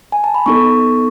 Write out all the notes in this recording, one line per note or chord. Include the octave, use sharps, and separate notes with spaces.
G#5
A5
B5
B3 D#4 A4 C#6